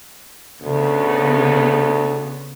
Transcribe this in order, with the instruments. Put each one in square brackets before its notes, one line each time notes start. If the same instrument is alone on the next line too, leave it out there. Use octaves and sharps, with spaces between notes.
[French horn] D2 [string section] C#3 B3